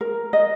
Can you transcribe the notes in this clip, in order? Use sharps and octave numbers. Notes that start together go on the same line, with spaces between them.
A#4
D#5